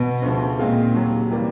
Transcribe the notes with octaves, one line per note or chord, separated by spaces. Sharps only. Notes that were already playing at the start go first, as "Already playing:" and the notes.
Already playing: B2
D2 C#3 F3
A#2 D#3 G#3 C4 F4 G#4
D#2 C#3 F#3
C3 E3 G3 A#3